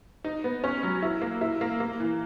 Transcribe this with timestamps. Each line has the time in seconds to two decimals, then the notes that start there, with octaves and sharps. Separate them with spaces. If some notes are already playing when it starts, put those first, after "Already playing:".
0.24 D#4
0.44 B3
0.64 C#4
0.83 F#3
1.02 E4
1.22 A#3
1.41 E4
1.61 A#3
1.80 A#3
2.00 E3